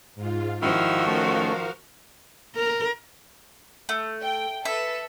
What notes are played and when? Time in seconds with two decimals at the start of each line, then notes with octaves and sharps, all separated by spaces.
0.15 G#2 F4
0.62 D#3 F3 E4 F#4 F5 E6
1.07 A3 C#4 A#4 F5
2.56 A#4
3.89 A3
4.23 G5
4.65 A4 B4 E5